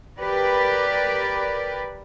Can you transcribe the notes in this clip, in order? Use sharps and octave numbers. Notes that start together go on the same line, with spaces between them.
G4 A#4 B4 D5